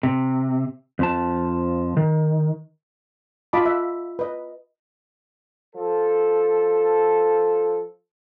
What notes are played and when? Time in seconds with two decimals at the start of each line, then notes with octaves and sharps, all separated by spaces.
0.03 C3
0.99 F2 F3 A5
1.97 D#3
3.53 F4 D#5 A5 B5 D6
3.66 E5
4.19 B4 D#5
5.75 F3 A4